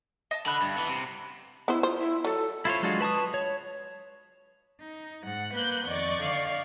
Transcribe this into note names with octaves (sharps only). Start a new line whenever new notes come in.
D#5 A5
D3 A5 B5 F#6
G2
E3 B3
C3
B3 E4 C5
F4 C5
E4
F#3 A4
E4 F4 C5 C#5
F#3 G#3 D4 F4 F#4
B4 A5 C#6 D#6
C#5
D#4
G#2 F#5
A#3 B4 F#6 G6
F2 D#3 D5 D#5 C#6
D3 F5